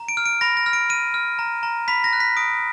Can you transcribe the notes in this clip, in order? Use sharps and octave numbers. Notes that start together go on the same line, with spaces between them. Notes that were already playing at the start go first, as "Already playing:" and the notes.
Already playing: A#5
D7
F6
D7
B5 A#6
A#6
F6
D7
F6 D#7
F6
A#5
A#5
B5 B6
A#6
F#6
B6
D#6 D7